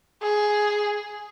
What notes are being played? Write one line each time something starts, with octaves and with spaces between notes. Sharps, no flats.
G#4